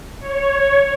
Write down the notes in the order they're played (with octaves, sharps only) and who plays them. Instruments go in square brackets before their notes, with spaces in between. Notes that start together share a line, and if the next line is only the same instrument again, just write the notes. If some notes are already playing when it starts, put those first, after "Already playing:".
[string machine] C#5